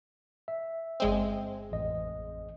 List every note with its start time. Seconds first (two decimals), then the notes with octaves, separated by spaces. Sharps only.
0.48 E5
1.00 G1 G#3 C4
1.72 A1 F2 D#5